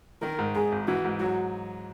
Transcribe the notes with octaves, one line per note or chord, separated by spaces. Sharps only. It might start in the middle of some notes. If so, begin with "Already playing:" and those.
D#3 A#4
G#2
G#2 G#4
G#1
E3 F#4
G#2
F#3 F#4